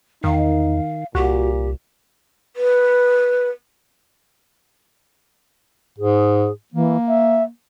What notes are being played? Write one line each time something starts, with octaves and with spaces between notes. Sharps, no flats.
E2 D#3 D#4 F5
C2 A#2 F#4 G4
B4
G#2 G#4
E3 A#3
E5